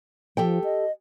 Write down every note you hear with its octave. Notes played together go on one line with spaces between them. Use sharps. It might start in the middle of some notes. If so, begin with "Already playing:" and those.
F3 G4 A4 G5
D#5